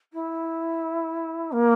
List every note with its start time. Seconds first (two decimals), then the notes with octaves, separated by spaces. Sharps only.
0.13 E4
1.52 A#3